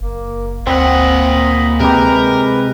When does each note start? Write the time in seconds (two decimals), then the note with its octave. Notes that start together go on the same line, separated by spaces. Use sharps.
0.01 F#1 A#3
0.67 D2 A#2 C4 D#5 F#5 B5
1.80 C3 G#3 G4 A#4 B4